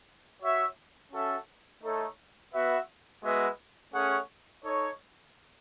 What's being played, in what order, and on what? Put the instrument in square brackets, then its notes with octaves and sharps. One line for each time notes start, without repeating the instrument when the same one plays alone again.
[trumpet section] F#4 C#5 E5
C#4 F#4 A4 E5
A3 D#4 A4 C#5
B3 F#4 B4 E5
G#3 B3 F#4 B4 E5
A3 C#4 G#4 C#5 F#5
D#4 A4 C#5